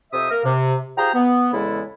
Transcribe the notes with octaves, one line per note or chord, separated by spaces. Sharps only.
F2 C3 C5 E5 D#6
A#3 A#4
C3
F4 G4 G#4 C5 A#5
B3
E2 C#3 G#3 E4 A4